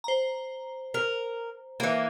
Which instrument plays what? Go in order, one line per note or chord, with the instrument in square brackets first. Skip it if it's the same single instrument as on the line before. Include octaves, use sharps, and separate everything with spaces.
[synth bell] C5 A#5
[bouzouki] A#4
E3 A#3